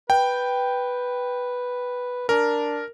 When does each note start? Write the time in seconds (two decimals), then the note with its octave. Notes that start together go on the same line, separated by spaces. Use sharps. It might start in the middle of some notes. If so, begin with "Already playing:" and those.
0.10 B4 G5
2.29 D4 A#4